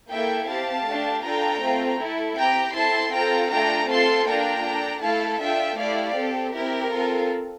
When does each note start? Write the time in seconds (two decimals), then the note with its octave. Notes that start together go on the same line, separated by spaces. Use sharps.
0.10 A#3 E4 A4 E5 G5
0.48 C4 G4 F5 A5
0.86 A3 D4 G4
1.24 D4 F4 A4 G5 A#5
1.62 A3 C4 F4
1.99 A3 E4 A4
2.37 C4 G4 G5 A#5
2.75 C4 E4 A4 A5 C6
3.13 C4 F4 A4 G5 A#5
3.51 A3 D4 F4 A4 G5 A#5
3.90 C4 F4 A4 A5 C6
4.28 A#3 D4 F4 G5 A#5
4.65 D4 A4
5.03 A3 E4 A4 F5 A5
5.40 D4 F4 A4 E5 G5
5.79 A3 E4 G4 D5 F5
6.17 C4 G4 A4
6.54 C4 E4 G4 A#4
6.93 C4 F4 A4